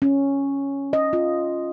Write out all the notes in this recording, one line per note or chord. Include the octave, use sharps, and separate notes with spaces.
C#4
D#5
F4